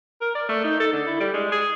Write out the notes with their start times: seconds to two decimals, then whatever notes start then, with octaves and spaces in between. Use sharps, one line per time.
0.21 A#4
0.35 D5
0.49 A3
0.64 D#4
0.80 A4
0.93 D3
1.07 E4
1.20 G3
1.33 G#3
1.52 G#4